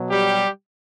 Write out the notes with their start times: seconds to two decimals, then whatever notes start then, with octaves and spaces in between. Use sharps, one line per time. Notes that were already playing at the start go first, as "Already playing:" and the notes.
Already playing: B2 F#3
0.10 G3 G4